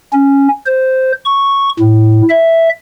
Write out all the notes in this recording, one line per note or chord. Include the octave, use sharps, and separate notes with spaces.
C#4
C5
C#6
A2
E5